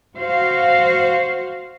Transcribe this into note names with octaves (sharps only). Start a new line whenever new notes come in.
F#4 C5 F5